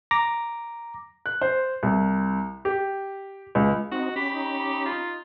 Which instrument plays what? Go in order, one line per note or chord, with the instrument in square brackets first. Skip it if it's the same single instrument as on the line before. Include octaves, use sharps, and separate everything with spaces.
[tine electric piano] A#5 D6 A#6
[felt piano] F#6
C5
C2
G4
C#2
[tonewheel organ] C4 D#4 [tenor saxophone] F#4 [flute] D#5
[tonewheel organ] C#4 B5 [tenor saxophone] G4 [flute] B6
[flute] D#4
[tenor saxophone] F4